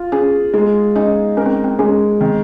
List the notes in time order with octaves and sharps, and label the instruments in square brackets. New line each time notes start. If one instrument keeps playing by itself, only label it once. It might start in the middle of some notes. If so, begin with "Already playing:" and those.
Already playing: [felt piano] F4
[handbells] C#4 [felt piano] G#4
[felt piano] G#3 [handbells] D#4
[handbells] C#4 [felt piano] D#4
[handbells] C#4 [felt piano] A#4
[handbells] C4
C4
[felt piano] G#3 [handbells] C#4
[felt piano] D#3 [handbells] C4